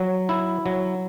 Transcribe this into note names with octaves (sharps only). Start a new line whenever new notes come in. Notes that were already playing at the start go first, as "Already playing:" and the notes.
Already playing: F#3
E4
F#3